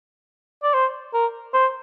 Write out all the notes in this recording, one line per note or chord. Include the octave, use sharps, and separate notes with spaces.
D5
C5
A#4
C5